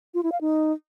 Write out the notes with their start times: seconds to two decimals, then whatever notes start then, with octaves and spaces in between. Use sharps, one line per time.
0.14 F4
0.23 E4
0.32 F5
0.41 D#4